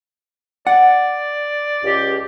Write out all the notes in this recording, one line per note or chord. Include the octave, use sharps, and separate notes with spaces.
D5 F#5
C#2 G4